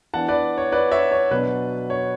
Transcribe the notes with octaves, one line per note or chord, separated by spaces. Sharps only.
E3 B3 D4 F#5 A5
B4 D5
C#5
B4 D5
C#5 E5
C#5
B2 F#3 B3 D4 B4
C#5